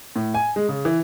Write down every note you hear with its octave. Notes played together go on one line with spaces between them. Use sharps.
A2
G#5
G#3
C#3
E3